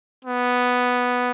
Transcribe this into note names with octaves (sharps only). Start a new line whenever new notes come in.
B3